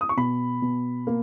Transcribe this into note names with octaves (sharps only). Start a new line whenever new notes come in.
D#6
C#6
B2 B5
B2
A#3